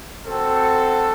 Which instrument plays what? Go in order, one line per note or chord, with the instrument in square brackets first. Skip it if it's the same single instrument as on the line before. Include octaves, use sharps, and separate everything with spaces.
[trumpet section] C4 F#4 A4